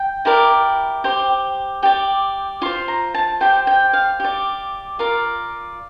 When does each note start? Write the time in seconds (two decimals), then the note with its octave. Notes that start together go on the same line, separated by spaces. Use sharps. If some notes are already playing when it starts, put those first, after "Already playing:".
Already playing: G5
0.25 E4 G4 A#4 D5
1.04 G4 C5
1.83 G4 D5 G5
2.62 F4 C5 C6
2.88 A#5
3.14 A5
3.41 G4 C5 G5
3.67 G5
3.93 F5
4.20 G4 D5
4.99 F4 A#4 D5